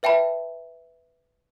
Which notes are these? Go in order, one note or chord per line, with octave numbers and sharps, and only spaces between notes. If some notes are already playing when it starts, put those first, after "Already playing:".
B4 E5 G5 A5 B5